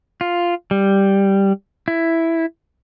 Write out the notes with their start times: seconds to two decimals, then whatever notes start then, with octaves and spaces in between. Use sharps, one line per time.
0.21 F4
0.71 G3
1.88 E4